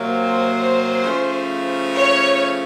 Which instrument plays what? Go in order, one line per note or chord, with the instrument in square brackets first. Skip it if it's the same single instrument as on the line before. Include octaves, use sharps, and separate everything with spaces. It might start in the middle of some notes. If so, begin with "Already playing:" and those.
Already playing: [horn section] C3 F#3 A#3
[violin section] C5
[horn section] C#3 F3 A3 C#4
[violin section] C#5